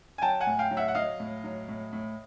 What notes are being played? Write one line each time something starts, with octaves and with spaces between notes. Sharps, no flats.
G#5
F#3 G5 A5
F#5 G#5
A2
F5 G5
F#3
E5 F#5
F#5
F#3 D#5 F5
A2
F#3
A2
A2